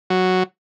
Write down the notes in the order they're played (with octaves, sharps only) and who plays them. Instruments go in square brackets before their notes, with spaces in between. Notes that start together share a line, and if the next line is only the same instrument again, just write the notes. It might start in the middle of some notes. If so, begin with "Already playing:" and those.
[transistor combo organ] F#3